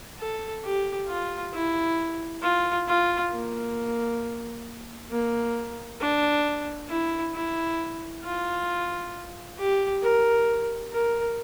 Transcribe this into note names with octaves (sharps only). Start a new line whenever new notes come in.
A4
G4
F4
E4
F4
F4
A#3
A#3
D4
E4
E4
F4
G4
A#4
A#4